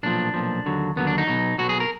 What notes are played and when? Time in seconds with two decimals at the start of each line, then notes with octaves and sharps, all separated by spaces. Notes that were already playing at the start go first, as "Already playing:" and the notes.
0.03 B1 A#2 F3 D4
0.34 B1 A#2 F3
0.66 D#2 D3 F#3
0.96 D#2 D3 F#3 B3
1.07 D4
1.18 D#4
1.27 B1 B2 F#3
1.58 B1 B2 F#3 F#4
1.69 G#4
1.80 A#4